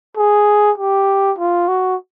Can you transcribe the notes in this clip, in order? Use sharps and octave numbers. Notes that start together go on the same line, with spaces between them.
G#4
G4
F4
F#4